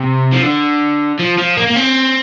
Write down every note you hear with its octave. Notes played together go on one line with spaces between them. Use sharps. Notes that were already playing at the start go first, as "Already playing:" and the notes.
Already playing: C3
F3
D3
F3
F3
A#3
A#3
C4